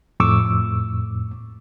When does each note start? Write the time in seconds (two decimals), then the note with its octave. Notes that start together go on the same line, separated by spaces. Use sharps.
0.20 F2 A2 C#6 D6 E6